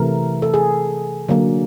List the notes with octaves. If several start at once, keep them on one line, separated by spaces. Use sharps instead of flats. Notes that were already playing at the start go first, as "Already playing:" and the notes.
Already playing: C3 E3 A3 A#4
A4
G#4
D3 F#3 A#3